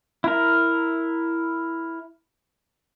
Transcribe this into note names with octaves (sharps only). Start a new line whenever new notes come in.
E4 A#4